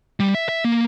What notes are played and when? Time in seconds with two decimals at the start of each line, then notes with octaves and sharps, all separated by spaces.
0.20 G3
0.35 E5
0.49 E5
0.65 A#3